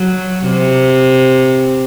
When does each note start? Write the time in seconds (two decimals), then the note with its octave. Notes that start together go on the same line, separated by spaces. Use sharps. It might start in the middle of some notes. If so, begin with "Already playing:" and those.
Already playing: F#3
0.46 C3